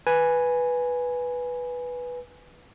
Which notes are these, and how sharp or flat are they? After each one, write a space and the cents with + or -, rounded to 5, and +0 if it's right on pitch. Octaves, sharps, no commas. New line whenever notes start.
B4 -5 G#5 +0